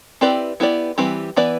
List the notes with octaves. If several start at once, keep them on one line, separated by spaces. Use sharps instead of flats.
C4 E4 G4 B4 D5
B3 E4 G4 D5
E3 G3 C4 G4 B4
E3 B3 E4 B4 D5